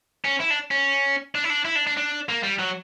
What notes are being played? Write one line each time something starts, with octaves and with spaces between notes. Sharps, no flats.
C#4
E4
D4
C#4
D4
E4
D4
E4
D4
D4
D4
A#3
G3
F#3